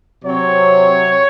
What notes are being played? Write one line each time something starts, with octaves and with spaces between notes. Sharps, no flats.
C3 F#3 C4 C#5